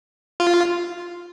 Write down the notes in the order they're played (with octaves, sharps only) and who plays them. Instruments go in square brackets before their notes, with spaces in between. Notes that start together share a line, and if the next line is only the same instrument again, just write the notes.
[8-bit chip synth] F4